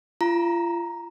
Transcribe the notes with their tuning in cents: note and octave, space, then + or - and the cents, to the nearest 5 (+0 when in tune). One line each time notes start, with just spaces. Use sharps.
F4 -35 A#5 +0